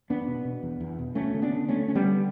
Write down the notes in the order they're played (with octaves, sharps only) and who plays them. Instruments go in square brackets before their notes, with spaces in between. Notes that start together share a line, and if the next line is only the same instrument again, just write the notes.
[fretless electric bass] E2 B3 D4
B2
B2
E2
E2
B2
D2 A3 C#4
D3
B3 D4
D3
D2 A3 C#4
D2 C#4
G3 B3
D3